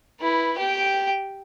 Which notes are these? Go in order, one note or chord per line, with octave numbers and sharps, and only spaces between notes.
E4 B4
G4 G5